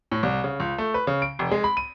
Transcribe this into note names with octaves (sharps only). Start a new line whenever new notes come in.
A2
C2
C#3
C#2
A3
B4
C#3
D7
F1
G#3
B5
D#7